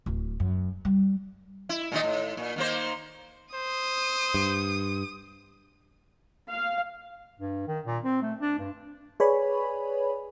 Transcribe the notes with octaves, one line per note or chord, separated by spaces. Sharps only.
D1
F#2
G3
E4
A#2 D#3 D#5
A2
A#2
D#3 A#3 C5
C5 D#6
G2
F5
G2
D#3
A#2
C4
A3
D4
G2
G#4 B4 C#5 D5 G#5 B5